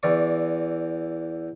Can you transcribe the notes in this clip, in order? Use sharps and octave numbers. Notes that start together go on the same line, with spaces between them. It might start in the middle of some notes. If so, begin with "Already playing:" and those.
E2 E3 D5 C#6